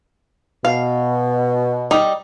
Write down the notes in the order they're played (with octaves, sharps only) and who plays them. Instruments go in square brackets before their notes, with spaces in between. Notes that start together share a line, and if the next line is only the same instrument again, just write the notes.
[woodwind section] B2 [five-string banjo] F5
[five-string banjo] G3 D#4